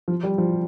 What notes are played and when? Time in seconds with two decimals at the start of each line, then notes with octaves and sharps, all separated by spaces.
0.08 F3
0.23 G3
0.38 F3